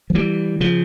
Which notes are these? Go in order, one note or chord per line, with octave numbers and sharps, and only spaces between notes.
F3
E3 G3
C#3 F3